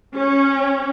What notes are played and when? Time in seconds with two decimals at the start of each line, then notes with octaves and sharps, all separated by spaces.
0.15 C#4